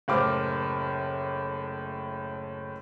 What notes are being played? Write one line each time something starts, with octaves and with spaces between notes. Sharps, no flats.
F#1 A2 C5 D6 F6